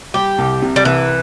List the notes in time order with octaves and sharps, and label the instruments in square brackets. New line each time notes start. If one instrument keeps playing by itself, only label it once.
[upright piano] G3 [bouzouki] G4
[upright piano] C2
C3
[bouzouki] G3
[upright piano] C2 [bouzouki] E3